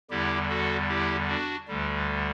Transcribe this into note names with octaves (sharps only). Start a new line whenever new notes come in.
E2 D3 G3 E4 G4
F#4 A4
E4 G4
D4 F#4
D2 D3 G3